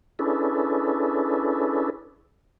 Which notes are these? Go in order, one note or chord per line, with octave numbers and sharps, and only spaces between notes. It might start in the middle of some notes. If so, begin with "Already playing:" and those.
C#4 D4 E4 G#4 A4 B4